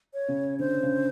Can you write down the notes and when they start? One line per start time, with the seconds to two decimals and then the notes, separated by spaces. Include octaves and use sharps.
0.14 C#5
0.29 C#3
0.59 D3 C5
0.83 C#3